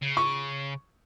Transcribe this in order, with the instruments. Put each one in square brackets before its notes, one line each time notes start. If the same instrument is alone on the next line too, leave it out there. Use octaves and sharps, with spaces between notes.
[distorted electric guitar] C#3
[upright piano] C#6